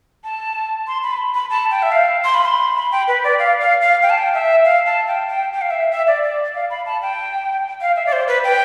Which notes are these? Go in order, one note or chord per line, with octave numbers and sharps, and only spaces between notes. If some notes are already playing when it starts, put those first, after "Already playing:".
A5
C6
B5
B5
A5
G5
E5
F5
C6
B5
C6
B5
G5
B4
D5
F5
F5
F5
G5
A5
G5
E5
F5
A5
G5
G5
G5
F5
E5
E5
D5
D5
F5
B5
A5
G5
F5
E5
D5
C5
B4
G5